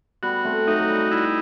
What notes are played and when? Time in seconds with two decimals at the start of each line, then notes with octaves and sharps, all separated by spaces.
0.23 G3 B3 F#4
0.45 A3 C4
0.67 F#3 A3 D#4
0.80 F#3
0.89 G3
1.11 G3 E4